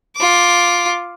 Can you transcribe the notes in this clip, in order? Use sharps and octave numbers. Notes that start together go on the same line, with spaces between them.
F4 D6